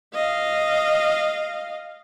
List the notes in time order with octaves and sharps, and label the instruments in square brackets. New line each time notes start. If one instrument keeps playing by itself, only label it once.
[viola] D#5 F5